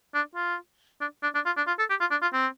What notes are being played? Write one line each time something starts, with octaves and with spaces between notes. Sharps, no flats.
D4
F4
D4
D4
D4
F4
D4
F4
A4
G4
F4
D4
F4
C4